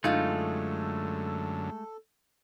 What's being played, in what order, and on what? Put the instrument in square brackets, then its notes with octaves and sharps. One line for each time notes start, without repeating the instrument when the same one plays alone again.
[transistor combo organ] F#2 D3 [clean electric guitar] G#3 A3 [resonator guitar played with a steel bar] D#4 F4 [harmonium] A4